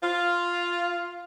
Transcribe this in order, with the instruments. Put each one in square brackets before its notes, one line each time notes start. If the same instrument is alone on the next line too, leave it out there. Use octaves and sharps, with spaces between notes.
[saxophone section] F4